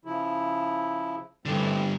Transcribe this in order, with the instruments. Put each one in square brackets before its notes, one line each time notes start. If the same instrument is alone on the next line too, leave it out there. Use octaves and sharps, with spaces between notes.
[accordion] C#3 F3 E4
[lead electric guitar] G2 D3 [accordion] E3 A3 C4